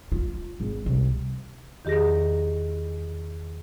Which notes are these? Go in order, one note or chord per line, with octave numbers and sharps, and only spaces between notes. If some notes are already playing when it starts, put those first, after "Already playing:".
F4
G#1
C2
E2 D#3 G4 G#4 A#6